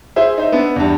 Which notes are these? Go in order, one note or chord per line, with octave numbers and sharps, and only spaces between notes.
E4 G#4 C5 E5
D#4 C5 E5
B3 D4 E4
E2 G2